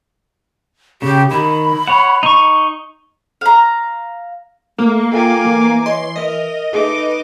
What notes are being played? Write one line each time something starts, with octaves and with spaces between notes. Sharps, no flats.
C#3 G4
D#3 B5
C#5 F#5
D#4 C#6
F5 A#5
A3 A#3
F4 A4 E5 G5 G#5 D6
E3
C#5 D#5 C6
A#4 D#5 E5
D#4 G#4 A4 B4 E5 D6